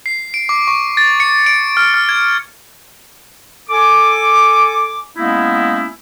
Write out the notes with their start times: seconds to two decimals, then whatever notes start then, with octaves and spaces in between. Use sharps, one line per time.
0.06 C7
0.34 D7
0.49 D6
0.67 C#6
0.97 A6
1.20 C#7
1.46 D7
1.77 F6
1.94 F6
2.09 G#6
3.69 A4 G#5 D6
5.17 G#3 A#3 B3 C#4 D#4 E4